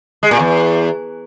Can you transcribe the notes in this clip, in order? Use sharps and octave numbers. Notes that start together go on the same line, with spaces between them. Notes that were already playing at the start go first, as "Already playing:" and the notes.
G#3
A#2
E2